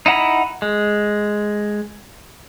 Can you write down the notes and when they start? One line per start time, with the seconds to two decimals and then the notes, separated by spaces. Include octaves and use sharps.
0.06 D#4 E4 F#5 A#5 B5
0.62 G#3